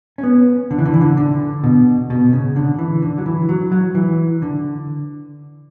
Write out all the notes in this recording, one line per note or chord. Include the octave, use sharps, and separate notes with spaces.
C#4
B3
D3
E3
D3
E3
D3
D3
B2
B2
C#3
D3
E3
D3
F#3
E3
F#3
F#3
E3
D3